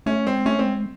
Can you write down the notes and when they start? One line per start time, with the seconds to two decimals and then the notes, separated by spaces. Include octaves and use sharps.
0.06 A3 C#4
0.26 G#3 C4
0.46 A3 C#4
0.59 C4
0.66 G#3